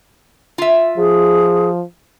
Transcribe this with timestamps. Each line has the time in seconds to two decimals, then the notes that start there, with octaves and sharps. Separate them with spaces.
0.58 F4 E5
0.97 F3 G#4